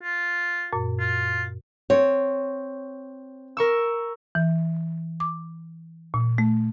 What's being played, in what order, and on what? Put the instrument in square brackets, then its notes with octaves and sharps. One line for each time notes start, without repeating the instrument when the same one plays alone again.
[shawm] F4
[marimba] F#2 A#2
[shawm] F4
[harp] C4 [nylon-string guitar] C#5
[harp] A#4 C#6 E6
[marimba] E3
D6
A#2
A3